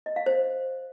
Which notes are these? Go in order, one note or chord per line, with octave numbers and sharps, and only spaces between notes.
D#5
F5
C5